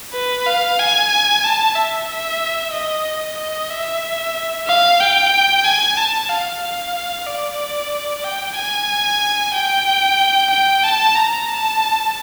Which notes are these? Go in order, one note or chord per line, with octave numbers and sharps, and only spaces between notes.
B4
F5
G#5
A5
E5
E5
D#5
D#5
E5
F5
G5
G#5
A5
F5
F5
D5
G5
G#5
G5
G5
A5
A#5
A5